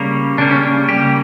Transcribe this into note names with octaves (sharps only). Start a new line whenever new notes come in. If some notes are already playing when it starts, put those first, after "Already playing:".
Already playing: C#3 G3 A#3
C#3 G3 A#3 D4
C#4
D4
C#3 G3 A#3 G4